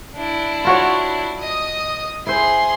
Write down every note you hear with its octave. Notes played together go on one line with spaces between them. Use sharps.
D4 E4
F4 F#4 C#5
D#5 D#6
E4 G#4 C5 C6